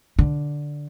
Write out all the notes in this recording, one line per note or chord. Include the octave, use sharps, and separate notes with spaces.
D3